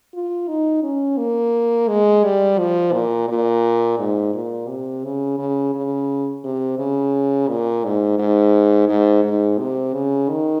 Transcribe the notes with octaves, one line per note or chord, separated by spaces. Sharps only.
F4
D#4
C#4
A#3
G#3
G3
F3
A#2
A#2
G#2
A#2
C3
C#3
C#3
C#3
C3
C#3
A#2
G#2
G#2
G#2
G#2
C3
C#3
D#3